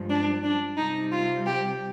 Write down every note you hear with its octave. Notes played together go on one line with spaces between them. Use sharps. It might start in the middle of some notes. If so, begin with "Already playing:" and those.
Already playing: G2 F3 G#3
D4
D4
C3 G3 D#4
F4
G4